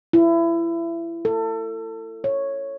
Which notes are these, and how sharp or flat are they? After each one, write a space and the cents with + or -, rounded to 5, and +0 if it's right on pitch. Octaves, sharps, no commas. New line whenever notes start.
E4 +25
A4 +30
C#5 -5